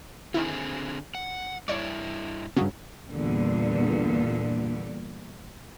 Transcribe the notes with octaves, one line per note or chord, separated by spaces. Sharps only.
D3 D#3 C4 E4 G#4
F#5
G2 E4 C#5 D5
G2 C#3 F#3 C4
E2 G2 A#2 D3